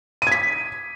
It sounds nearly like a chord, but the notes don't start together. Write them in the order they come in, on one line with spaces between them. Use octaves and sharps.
D#7 G#6 B6